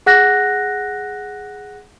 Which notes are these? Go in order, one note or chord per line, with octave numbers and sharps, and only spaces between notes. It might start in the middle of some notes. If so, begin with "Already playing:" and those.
G#4 F#5 F#6 A#6